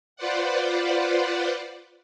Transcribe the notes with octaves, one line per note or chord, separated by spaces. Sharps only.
F4 B4 C5 D5 F#5